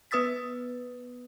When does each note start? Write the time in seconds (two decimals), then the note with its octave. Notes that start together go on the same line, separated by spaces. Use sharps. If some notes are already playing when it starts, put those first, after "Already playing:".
0.11 B3 B4 D#6 E6 A6 B6